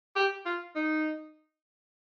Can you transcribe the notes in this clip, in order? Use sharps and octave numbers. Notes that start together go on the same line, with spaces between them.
G4
F4
D#4